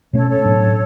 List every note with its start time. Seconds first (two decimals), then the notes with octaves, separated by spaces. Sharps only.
0.13 B2 A3 C#4 A4 C#5
0.28 A4 C#5
0.43 A2 F#3 B3 D4